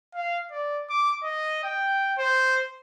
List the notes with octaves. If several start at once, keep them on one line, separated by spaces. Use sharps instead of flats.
F5
D5
D6
D#5
G5
C5